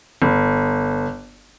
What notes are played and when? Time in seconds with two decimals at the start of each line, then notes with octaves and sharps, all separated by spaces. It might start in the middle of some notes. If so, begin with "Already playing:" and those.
0.22 G1